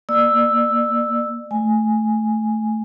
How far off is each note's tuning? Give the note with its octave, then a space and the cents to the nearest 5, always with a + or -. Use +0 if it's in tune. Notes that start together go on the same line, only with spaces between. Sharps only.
A#3 +0 D5 +25 E6 +0
A3 -5 G#5 +0